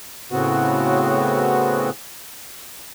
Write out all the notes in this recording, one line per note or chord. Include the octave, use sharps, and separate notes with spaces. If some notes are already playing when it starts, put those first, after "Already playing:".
A2 C#3 B3 C4 F#4